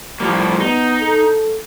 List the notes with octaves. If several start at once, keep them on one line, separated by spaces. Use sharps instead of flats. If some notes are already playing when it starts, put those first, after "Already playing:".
A2 F3 G3 A#3
B3 D#4
A4